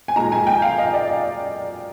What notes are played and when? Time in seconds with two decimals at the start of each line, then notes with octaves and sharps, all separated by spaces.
0.08 G#5
0.16 A#2 G#3 D#4 A#5
0.32 G#5
0.47 G5
0.62 F5
0.78 D#5
0.93 D5